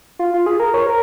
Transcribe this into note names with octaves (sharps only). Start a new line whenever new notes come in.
F4
F4
G#4
A#4
C#5
A#4